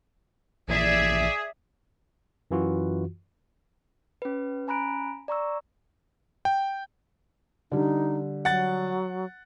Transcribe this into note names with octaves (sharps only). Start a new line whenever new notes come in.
A#1 A#2 E3 G#4 D5 E5
F#2 E3 F4 F#4
C#4 B4
C#4 G#5 A#5 B5 F#6 D7
D5 A#5 C#6 E6
G5
D3 G3 D#4
F#3 F#5 A6